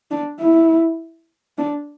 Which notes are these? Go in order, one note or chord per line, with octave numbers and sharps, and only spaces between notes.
D4
E4
D4